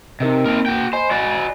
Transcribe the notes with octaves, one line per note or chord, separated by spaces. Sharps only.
C3 D#4 A#4 D#5
A#3 C4 A#4
F#4 G5
C5 D#5 G#5 B5
F#4 D5